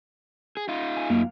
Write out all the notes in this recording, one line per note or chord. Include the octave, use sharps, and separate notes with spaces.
G#4
D#4 F4
G#5
F#2 A#3 F5